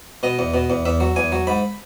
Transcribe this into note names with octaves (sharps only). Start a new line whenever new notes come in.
B2 D#5
E2
B2
E2
E2 E5
F#3
E2 G#5
F#3
G#2 B5